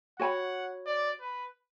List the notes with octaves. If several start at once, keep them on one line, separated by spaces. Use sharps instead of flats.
F#4 C#5 F#5 G#5 B5
D5
B4